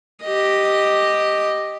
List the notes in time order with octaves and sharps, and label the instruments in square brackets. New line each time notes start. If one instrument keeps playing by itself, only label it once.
[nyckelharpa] G4 D#5